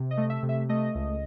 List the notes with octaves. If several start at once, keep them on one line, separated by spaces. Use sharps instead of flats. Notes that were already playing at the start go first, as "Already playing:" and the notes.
Already playing: C3
D#5
A3
E5
C3
E5
A3 D#5
C#2